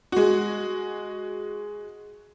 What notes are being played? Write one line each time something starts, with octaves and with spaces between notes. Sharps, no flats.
G#3 F#4